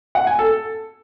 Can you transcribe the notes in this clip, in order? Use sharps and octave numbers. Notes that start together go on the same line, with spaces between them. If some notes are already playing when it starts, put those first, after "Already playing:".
F#5
G#5
A4